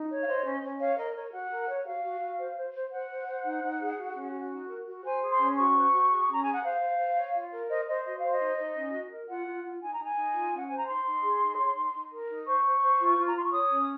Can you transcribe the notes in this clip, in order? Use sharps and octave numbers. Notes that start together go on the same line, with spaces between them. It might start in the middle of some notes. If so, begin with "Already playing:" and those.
Already playing: D#4
C#5
F5
C5 D#5
C#4
C#4
C#5 F5
A#4 D#5
A#4 C#5
F#4 F#5
A#4
C#5
F#4 F5
F#4
F#4
C5
C5
C5
C5 F#5
C5
C5
D#4
D#4
G#4
F#4
C#4
F#4
D#4
A#4
F#4
C5 G#5
G#4
C6
C#4
F#4 C#6
C5
F#4
G#4
C#4 A#5
G#4 G#5
F#5
C5 F5
C5
C5
C#5
F4
A#4
C5 D#5
C5 D#5
F#4 D#5
C5 F5
D#5
D#4
D#4
C#4
F#4
A#4
F4 F#5
F4
F4
D#4 G#5
A#5
D#4 G#5
D#4
F4
C#4
F#5
C5 G#5
A#5
D#4 C6
D#4
G#4
D#4
C#5
D#4
D#4
A#4
D#4
C5 C#6
C5
C5
F4
F4
A#5
F4 C6
C#6
C#5 D#6
C#4